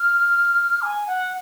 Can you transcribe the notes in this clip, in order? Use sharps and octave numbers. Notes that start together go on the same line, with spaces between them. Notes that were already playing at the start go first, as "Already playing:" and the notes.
Already playing: F6
G#5
F#5